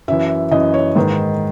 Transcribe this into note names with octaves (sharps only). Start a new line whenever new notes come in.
F#2 E3 E5
F#2 E3 D#5
C#5
G#2 D#3 B4